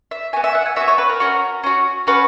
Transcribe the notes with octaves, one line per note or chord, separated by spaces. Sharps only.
E5
B3 F#4 G#5
E5
F#5
G#5
B3 F#4 E5
C#5
B4
A#4
C#4 F#4
C#4 F#4
C#4 F#4 B4